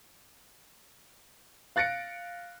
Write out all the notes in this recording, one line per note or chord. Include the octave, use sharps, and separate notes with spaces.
F5 F#6 A6 A#6 C#7 D7